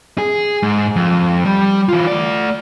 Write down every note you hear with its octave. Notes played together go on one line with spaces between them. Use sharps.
G#4
G#2
F2
G3
E3 F4
A3 D5